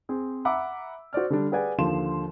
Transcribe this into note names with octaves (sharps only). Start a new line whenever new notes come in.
C4 G#4
E5 F#5 A#5 B5 D6 E6
F#4 C5 D5 F6
D3 G3 D4
G4 G#4 B4 D5 F#5 G#5
D#2 D3 F3 F4 C6 E7